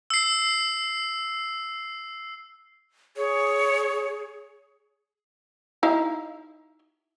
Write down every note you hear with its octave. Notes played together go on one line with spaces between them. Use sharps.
E6 C7
G#4 C#5
D#4 E4 F5